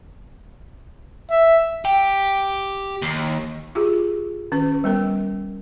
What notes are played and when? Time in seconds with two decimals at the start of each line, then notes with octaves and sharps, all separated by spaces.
1.31 E5
1.85 G4
3.02 D#2
3.75 F4 G4 G#4
4.52 D#3 C#4 B4
4.84 G3 B3 A#4